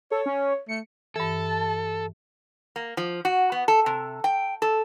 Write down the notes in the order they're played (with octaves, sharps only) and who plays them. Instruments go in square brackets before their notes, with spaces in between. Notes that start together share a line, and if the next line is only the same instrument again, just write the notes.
[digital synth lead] A4 [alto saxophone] C#5
[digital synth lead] C#4
[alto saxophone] A3 [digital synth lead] C#7
[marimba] G2 E3 [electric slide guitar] A4 [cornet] A5
[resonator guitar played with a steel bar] A#3
F3
F#4
B3
A4
C3
G5
A4